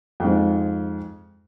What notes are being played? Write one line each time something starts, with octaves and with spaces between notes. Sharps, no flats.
F2 G#2